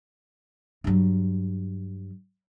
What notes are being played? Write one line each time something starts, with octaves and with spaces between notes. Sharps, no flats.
G2 F#3